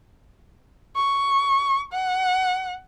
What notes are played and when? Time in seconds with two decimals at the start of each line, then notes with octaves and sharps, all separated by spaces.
0.97 C#6
1.93 F#5